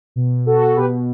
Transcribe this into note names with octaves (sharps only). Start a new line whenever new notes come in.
B2
F#4 A4
B2 G4 B4